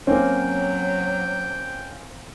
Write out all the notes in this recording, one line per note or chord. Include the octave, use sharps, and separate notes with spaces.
F#3 A#3 C4 C#4 G5